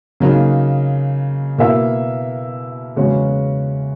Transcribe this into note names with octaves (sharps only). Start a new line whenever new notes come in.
C#3 F#3 A#3 D#4
B2 A#3 E4 A#4 E5
E2 C#3 G#3 C#4 F#4